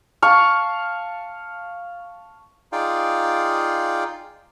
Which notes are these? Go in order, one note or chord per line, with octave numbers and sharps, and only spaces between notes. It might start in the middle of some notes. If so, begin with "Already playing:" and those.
F5 A5 C#6
D#4 F4 G#4 D5 F5 G5